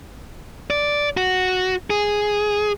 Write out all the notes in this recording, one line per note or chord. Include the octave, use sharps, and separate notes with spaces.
D5
F#4
G#4